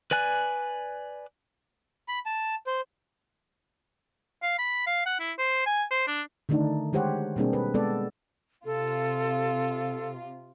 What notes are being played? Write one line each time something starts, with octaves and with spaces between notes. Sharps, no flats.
B4 D5 G#5 F#6
B5
A5
C5
F5
B5
F5
F#5
E4
C5
G#5
C5
D4
D3 D#3 A3 D4 D#4
D#3 G#3 G4 C5 C#5 F#5
B2 G3 A#3 C4 D4 G#4
B4
G#3 B3 A4 D5
C3 F4 A4